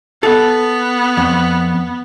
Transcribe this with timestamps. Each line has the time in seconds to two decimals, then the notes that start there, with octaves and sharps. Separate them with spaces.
0.23 B3 A4
1.17 F2